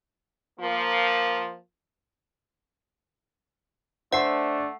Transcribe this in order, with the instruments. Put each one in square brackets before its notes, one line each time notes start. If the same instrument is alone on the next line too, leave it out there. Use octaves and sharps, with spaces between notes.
[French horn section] F3 A#3
[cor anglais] A3 [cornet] D4 [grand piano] C5 E5 [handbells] F#5 C7